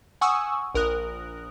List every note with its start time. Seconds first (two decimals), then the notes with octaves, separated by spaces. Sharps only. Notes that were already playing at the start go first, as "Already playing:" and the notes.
0.21 F#5 G#5 C#6 D#6 E6
0.75 A#1 A#4 D#6 F#6